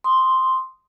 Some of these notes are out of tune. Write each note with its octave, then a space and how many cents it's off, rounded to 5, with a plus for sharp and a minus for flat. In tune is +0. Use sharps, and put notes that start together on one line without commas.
C6 +0 D#6 -5